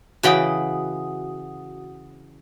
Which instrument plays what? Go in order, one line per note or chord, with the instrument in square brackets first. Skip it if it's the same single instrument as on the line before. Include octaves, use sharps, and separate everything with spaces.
[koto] C#3 E3 G5 [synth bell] F#4 F#5 D#6